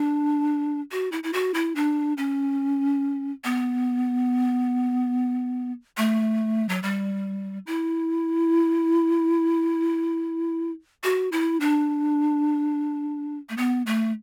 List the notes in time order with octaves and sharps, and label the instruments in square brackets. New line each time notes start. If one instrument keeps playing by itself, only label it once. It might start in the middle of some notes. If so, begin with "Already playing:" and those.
Already playing: [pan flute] D4
F#4
E4
E4
F#4
E4
D4
C#4
B3
A3
F#3
G3
E4
F#4
E4
D4
A3
B3
A3